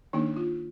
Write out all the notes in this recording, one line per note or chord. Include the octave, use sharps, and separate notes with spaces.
D#3 A#3 D4 D#4
F4